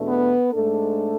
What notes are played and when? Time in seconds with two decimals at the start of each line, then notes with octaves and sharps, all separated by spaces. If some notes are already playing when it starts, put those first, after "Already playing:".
Already playing: E2 B2 A3 D4
0.09 B3 B4
0.53 G#2 G#3 A3 D4 A4